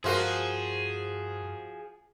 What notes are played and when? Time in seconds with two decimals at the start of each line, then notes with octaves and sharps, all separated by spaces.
0.04 G2 F3 F#4 G#4 A#4 F5 C6